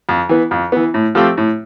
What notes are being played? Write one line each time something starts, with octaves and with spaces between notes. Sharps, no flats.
F2
E3 B3
F2
E3 B3
A2
F3 A3 C4 G4
A2